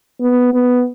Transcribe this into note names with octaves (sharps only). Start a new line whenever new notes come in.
B3
B3